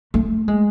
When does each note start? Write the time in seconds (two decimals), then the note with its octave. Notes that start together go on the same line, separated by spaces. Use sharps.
0.14 A3
0.48 G#3